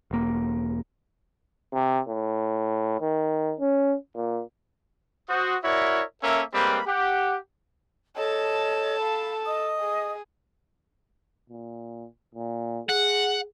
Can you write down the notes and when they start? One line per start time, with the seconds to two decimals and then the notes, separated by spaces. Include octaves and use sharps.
0.11 E1 A#3
1.74 C3
2.09 A2
3.00 D#3
3.60 C#4
4.15 A#2
5.29 F#4 C5 D#6
5.64 E4 F#4 A#4 C#5 D5 E5
6.22 A#3 C#4 A4 A#4 E5
6.54 G3 G#3 A#3 C4 B4 B5
6.87 G4 F#5
8.17 A4 C#5 D#5 A5
9.00 F5 B5
9.45 D#5 D#6
9.80 G#4
11.50 A#2
12.35 A#2
12.89 G#4 F#5